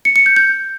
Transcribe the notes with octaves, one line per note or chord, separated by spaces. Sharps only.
C#7
C#7
G6
G6